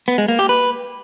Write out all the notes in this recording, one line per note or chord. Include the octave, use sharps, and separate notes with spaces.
B3
G#3
A#3
G4
B4